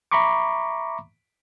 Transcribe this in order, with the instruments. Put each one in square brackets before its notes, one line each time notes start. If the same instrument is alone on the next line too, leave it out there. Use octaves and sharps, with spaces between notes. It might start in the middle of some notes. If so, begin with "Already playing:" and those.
[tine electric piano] E5 A#5 B5 C#6 D6